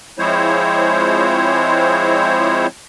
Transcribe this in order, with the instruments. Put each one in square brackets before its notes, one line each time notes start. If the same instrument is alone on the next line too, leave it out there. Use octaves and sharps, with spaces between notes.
[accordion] F3 G#3 C4 E4 C5 C#5